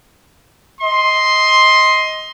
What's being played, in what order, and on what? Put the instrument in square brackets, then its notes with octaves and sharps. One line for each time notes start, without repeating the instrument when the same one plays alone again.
[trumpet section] D#5 C6